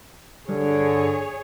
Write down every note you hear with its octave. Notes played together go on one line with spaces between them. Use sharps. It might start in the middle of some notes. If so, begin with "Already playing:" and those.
G2 D3 G#4 C#5